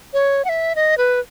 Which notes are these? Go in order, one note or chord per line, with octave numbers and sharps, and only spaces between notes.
C#5
F#5
E5
D#5
B4